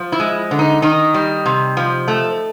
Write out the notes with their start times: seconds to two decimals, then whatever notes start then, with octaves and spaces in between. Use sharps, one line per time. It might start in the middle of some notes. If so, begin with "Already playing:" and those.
Already playing: F3
0.12 E4
0.20 G#3
0.51 D3
0.59 D#4
0.82 D#3 D#4
1.14 G3
1.46 C3
1.77 F3
2.08 A3